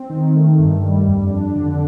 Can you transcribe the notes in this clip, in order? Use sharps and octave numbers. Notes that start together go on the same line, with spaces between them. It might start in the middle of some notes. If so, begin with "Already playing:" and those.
Already playing: C4
D#3
A3
G2
G3
F2
D4
D3